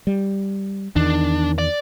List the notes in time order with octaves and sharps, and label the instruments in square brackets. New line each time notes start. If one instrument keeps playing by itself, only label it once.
[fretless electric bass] G3
[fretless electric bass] E2 D#3 [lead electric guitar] D4
[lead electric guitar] D5